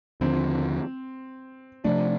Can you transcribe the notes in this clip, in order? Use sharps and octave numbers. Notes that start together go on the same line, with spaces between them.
D#2 D3 F3 C4
C3 F3 A3 D4